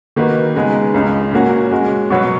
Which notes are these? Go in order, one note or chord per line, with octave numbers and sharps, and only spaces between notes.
D#3 A#3 D#4 F#4 B4
C#3 G#3 B3 D#4 G#4
C#2 C#3 G#3
A#2 A#3 C#4 F#4
G#3 C#4 F#4
B2 F#3 B3 F#4 C#5